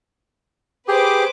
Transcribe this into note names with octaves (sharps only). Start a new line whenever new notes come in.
G4 G#4 B4 C5 D6